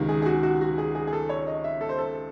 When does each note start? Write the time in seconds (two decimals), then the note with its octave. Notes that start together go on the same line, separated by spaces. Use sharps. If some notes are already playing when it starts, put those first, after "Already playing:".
Already playing: C#2 C3 D#3
0.09 G#4
0.22 G#4
0.26 F#4
0.43 F#4
0.61 F#4
0.78 G#4
0.95 G#4
1.07 G#4
1.13 A4
1.29 C#5
1.47 D#5
1.64 E5
1.81 A4
1.89 C5
1.99 A4